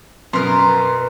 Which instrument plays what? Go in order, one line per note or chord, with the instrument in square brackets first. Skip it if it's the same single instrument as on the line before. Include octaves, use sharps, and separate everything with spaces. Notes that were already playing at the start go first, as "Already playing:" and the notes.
[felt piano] F#2 [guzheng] B2 A#4 [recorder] B4 [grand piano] C6